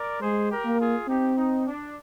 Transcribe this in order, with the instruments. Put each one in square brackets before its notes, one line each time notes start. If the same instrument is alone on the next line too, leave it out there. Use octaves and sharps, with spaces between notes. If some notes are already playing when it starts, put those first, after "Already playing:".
Already playing: [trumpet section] A#4 D5
[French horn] G#3 [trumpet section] G#4 C5
[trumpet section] G4 A#4
[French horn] A#3
[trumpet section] F4 G#4
[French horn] C4 [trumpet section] D#4 G4
[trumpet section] D#4
D4